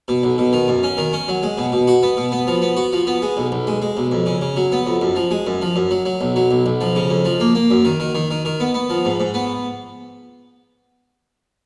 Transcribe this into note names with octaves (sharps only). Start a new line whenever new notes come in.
B2
B1
B2
D#3
F#2
C#4
D#3
C#4
F#3
G#3
B2
B2
F#4
B3
B2
B3
F3
B3
F#4
F3
B3
G#3
B1
B1
G#3
G#3
B1
F2
C#3
C#3
F#3
B3
F2
F#2
F3
G#3
F#2
F3
F#2
F#3
F#3
B1
F#3
B1
B1
F3
C#3
F2
F3
A#3
A#3
F#2
D#3
D#3
D#3
D#3
D#3
B3
B3
F3
G#2
G#2
B3